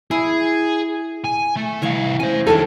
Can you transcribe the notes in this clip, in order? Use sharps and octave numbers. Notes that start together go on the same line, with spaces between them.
E4 G#4
G#5
A3
C2 E3 C#5 F5 C#6
C#4 C5 G#5
D#3 E3 D4 D#4 A4 G#5